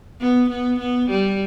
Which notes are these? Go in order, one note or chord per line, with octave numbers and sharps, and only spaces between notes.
B3
B3
B3
G3